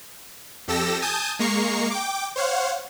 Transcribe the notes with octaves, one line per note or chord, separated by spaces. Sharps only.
F2 G4 A4 E6 A#6
G#5 A5 D#6 G6
G#3 A#3 A#5 C#6 C7
G5 D6
C5 C#5 F5 F#5